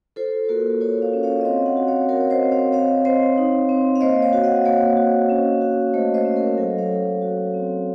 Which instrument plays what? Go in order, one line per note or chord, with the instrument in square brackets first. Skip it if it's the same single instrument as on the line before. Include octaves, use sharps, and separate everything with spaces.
[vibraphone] F4 A4 C5
A#3 F#4 A#4
F4 A#4 C#5
C#5 F5
C#4
C#5 F5
D#5
C4 C#5 F5
D#5 F#5
F#4
C#5 F5
F#4 A#4 C#5
C#5
C5 D#5
C4
C#5 F5
C4 C#5 F5
C4 C5 D#5
D#4
C4
F5
A#3 C5 D#5
C#5 F5
F#4
D#5 F#5
A#3 C#5 F5
F#4
C#4
F#4
A3 C5 D#5
C5 D#5
C#4
A#4 C#5
F#3 A4 C5
C#5 F5
F#3
F#4
C4